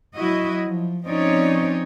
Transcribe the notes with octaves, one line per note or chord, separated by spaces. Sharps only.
F#3 E4 F#4 D#5
F3
F3 C4 C#4 D#4 C#5 D5